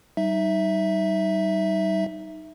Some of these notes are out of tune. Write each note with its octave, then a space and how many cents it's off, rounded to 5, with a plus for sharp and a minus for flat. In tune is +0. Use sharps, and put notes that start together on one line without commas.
G3 -30 D#4 +0 E5 +0